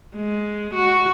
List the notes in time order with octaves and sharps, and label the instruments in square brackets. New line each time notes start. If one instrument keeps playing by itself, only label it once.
[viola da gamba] G#3
F#4